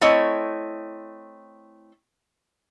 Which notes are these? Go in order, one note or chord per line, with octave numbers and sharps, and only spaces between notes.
A3 C4 E4 C#5 D#5